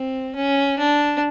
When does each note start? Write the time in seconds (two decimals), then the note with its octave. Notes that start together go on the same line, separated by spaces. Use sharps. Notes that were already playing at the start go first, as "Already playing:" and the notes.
Already playing: C4
0.35 C#4
0.79 D4